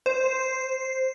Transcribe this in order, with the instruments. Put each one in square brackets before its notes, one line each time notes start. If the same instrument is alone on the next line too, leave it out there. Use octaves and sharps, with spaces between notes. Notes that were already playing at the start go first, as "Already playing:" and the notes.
[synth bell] C5